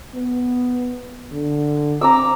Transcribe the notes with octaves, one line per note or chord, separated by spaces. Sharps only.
B3
D3
C4 A#5 D6 E6